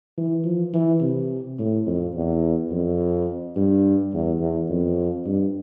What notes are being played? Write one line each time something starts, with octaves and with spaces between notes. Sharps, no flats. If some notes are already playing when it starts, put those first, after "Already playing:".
E3
F3
E3
C3
A2
F2
E2
F2
G2
E2
E2
F2
G2